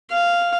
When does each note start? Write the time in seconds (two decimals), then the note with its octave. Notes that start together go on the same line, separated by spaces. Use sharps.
0.11 F5